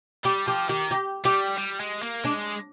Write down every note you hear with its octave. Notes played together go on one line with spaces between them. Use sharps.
G3 G4
F3 G4
D#3 G4
G4
G3 G4
G3
G#3
A#3
G#3 D4